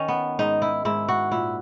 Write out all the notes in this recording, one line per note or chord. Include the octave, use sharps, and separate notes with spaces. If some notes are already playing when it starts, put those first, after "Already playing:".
Already playing: D#3 C#4
B3
G#2 D#4
E4
G#2 E4
F#4
A#2 E4